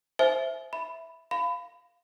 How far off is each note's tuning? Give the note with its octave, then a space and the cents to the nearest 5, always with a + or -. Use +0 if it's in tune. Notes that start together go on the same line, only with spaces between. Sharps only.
C5 +0 E5 +0 G#5 +35
E5 +0 B5 +0
F5 +0 B5 +25